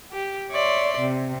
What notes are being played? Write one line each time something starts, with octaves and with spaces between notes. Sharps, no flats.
G4
C#5 D5 E5 C6
C3